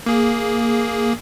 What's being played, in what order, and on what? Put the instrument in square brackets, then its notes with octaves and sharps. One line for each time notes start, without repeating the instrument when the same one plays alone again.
[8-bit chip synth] A#3 G#4